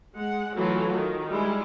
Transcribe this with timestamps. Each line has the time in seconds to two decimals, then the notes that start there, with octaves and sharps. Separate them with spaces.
0.15 G#3 F#5
0.56 E3 F#3 A3 F4 F#4
0.93 D#3
1.29 G3 G#3 E4